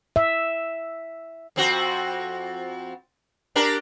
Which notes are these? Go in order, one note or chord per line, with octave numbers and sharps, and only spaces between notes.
E5
F2 C4 F#4
D4 G4 A#4